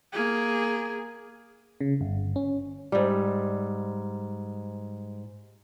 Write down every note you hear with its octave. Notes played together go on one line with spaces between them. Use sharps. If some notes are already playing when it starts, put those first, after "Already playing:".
A#3 G#4
C#3
G1
C#4
G#2 G3